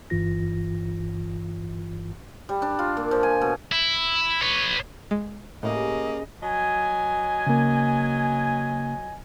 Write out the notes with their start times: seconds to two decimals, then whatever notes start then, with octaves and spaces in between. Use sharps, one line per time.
0.10 G1 G2 E3 F4 A#6
2.49 G3
2.62 D4
2.79 F4
2.97 A#2
3.11 F3
3.23 G#5
3.41 B2
3.72 E4
4.42 B4 C#5
5.11 G#3
5.63 A2 C#3 A#3 G4 D#5
6.43 F#3 D#5 G#5
7.47 C#3 A#3